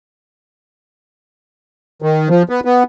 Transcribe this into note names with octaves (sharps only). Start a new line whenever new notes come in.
D#3
F3
B3
B3